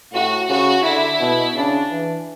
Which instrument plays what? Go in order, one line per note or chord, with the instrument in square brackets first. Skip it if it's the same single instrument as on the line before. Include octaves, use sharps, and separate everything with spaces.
[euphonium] A2 [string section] F#4
[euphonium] C#3 [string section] F#4
[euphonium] D3 [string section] E4
[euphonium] B2
[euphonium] C#3 [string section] D4
[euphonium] E3